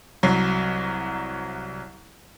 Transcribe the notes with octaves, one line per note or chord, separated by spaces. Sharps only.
C2 F#3 C7